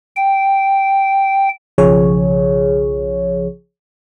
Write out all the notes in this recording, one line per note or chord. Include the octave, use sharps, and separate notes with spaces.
G5
B1 C#3 F3 G#4 C#5